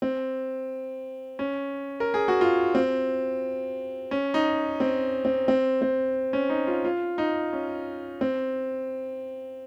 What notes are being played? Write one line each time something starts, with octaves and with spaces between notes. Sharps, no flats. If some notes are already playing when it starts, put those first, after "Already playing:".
C4
C#4
A#4
G#4
F#4
F4
C4
C#4
D#4
C4
C4
C4
C4
C#4
D#4
F4
F4
D#4
C#4
C4